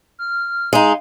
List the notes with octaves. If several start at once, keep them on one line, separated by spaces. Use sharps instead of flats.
F6
G#3 D#4 F5